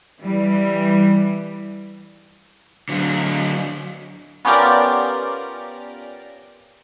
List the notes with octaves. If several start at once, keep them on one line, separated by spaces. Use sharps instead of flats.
E3 G3
D3 F#3
B3 C#4 F4 G4 A#4 D5